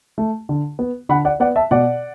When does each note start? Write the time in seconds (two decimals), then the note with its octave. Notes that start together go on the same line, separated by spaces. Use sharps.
0.18 A3
0.49 D3
0.79 B3
1.09 D3 F#5 B5
1.25 D5 F#5
1.40 B3 D5 F#5
1.56 E5 A5
1.71 B2 D5 F#5